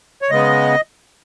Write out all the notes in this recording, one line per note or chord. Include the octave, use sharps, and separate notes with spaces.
C#5
C#3 G#3 B3 D#5